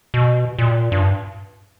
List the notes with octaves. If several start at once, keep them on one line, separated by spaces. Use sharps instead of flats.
B2
A#2
G2